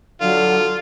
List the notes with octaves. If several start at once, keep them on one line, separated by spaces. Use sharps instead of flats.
D3 F#3 F4